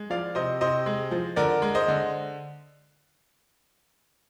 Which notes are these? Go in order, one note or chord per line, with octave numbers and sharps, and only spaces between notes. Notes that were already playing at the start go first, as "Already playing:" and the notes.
Already playing: G#3
F3 D5 F5
C3 C5 D#5
C3 C5 D#5
G#3
F3
D3 A#4 D5
G#3
C5 D#5
D3